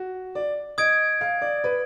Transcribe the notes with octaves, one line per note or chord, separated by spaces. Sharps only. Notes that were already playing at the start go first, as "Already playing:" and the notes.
Already playing: F#4
D5
D#5 D#6 G#6 D7
F5
D5
B4